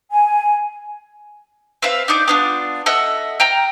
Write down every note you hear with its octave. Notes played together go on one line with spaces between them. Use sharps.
G#5
C4 B4 E5 F5
D4 D#4 D5 G6
B3 D4 F4
A4 D#5 E5 F#5
G5 A#5 F6